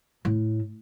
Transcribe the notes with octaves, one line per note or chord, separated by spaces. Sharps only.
A2